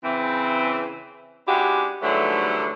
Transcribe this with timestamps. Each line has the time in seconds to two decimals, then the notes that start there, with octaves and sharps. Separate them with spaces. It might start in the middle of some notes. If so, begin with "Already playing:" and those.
0.04 C#3 E3 C4
1.48 G#3 C#4 D4 E4 F#4 G4
2.02 G#2 D3 E3 F#3 G3 A3